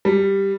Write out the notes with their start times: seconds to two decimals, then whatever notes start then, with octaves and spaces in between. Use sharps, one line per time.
0.05 G3